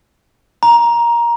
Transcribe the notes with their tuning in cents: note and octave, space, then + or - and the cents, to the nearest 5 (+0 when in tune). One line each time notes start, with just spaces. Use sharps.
A#5 +15